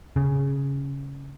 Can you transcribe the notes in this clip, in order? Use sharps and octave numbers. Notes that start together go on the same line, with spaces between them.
C#3